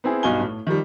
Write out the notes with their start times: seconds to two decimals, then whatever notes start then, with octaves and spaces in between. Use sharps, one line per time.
0.04 B3 C4 E4 G#4
0.23 B1 G2 D#4 F#4 G#5 G7
0.41 A2
0.67 D#3 F3 G3